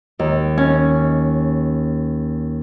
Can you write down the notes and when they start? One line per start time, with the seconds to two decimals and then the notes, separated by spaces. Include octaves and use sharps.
0.19 D#2
0.57 C#4